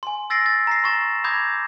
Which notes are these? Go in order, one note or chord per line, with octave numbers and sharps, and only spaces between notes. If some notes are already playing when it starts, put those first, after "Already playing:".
G#5 C6
E6 A6 A#6 C7 D7
A6
A#5 A#6 C7
C6 C#6 A6 E7
B5 D6 D#6 G6 G#6 A#6